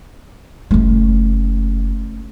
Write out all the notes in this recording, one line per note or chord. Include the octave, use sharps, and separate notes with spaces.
F#1 A3 C#4